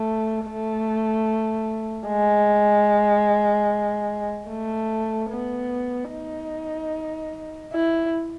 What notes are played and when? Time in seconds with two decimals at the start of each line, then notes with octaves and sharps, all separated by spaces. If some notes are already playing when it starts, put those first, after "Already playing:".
Already playing: A3
0.46 A3
2.07 G#3
4.49 A3
5.30 B3
6.11 D#4
7.73 E4